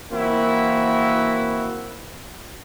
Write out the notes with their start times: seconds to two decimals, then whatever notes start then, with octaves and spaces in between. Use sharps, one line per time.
0.11 E3 A#3 C4 E4 F#4